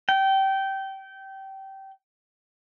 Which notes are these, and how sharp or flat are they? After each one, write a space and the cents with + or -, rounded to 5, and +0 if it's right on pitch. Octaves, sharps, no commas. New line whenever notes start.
G5 -20